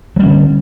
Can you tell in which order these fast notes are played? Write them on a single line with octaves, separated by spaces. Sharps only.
F#3 G3 C#4 D3